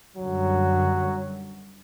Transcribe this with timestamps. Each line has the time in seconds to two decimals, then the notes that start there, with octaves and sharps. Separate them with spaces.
0.16 F#2 D3 F#3 G3